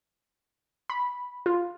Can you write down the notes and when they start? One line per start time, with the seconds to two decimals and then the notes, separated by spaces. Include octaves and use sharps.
0.90 B5
1.46 F4